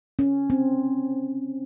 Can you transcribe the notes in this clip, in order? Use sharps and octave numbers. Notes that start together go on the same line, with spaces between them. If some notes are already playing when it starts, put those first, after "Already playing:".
C#4
C4